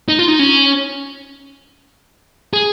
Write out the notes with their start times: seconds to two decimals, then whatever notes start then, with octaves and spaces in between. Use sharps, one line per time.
0.09 D#4
0.19 F4
0.28 D#4
0.39 C#4
2.54 G#4